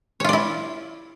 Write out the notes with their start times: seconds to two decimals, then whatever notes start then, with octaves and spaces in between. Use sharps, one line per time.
0.20 C#5
0.24 F4
0.29 D5
0.33 E4